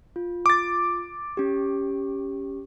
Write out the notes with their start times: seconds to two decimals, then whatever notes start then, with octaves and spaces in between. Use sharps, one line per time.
0.16 F4
0.46 D6 A6
1.37 C#4 G4